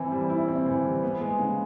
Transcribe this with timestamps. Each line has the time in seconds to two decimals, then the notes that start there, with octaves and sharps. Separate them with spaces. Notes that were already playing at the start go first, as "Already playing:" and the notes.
Already playing: E3 C4 E4
0.12 G3
0.30 E4
0.48 C4
0.66 E3
0.85 G3
1.03 B3
1.21 G#3
1.39 C#3